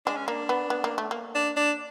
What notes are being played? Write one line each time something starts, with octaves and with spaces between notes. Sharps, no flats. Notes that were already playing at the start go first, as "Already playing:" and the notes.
G#3 D4
C#4
A#3 D4
B3
B3
A#3
A3
A#3
D4
D4